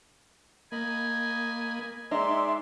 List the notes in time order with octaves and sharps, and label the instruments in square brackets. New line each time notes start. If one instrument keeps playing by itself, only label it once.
[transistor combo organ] A#3 [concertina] D#5 B5 [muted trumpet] G#5
[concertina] G#3 C6 [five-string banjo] D#4 [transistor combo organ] D5 E5